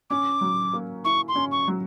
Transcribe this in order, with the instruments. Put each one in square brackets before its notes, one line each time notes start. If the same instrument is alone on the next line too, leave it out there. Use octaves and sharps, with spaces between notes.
[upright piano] C#4 [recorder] D6
[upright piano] F#3
A#3
[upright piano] E4 [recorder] C#6
[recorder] C6
[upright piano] C#4
[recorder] C#6
[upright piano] F#3